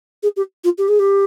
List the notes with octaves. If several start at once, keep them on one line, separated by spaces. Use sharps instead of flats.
G#4
G4
F4
G4
G#4
G4